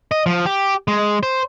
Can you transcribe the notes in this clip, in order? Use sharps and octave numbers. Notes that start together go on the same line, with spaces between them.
D#5
F3
G4
G#3
C5